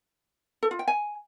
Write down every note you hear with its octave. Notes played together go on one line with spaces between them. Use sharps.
A4
F4
G5
G#5